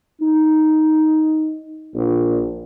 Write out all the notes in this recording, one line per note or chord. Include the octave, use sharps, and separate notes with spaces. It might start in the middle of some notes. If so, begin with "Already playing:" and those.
D#4
A#1